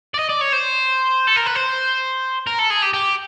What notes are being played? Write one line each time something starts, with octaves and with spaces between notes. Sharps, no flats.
D5
D#5
D5
C#5
C5
A4
A#4
B4
C5
A#4
A4
G#4
G4
G4